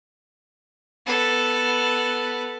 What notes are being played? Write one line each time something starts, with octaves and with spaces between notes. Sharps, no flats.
B3 A4